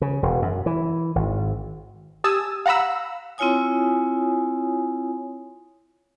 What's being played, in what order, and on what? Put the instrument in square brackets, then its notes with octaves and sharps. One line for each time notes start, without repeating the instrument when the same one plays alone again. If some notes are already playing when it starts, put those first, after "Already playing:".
[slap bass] C#3
E1
F#2
E3
G#1
[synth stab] G4 G#5 A5 D#6 E6
F5 F#5 A#5 B5 E6
[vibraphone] C4 E4 F4 C#5 G#5 D#6